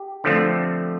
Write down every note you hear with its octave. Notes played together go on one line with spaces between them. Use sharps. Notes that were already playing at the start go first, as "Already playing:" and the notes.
Already playing: G4
D3 F3 A3 C4